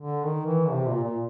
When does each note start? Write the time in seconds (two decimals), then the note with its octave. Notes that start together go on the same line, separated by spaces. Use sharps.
0.01 D3
0.24 D#3
0.46 E3
0.70 C3
0.87 A#2
1.04 A#2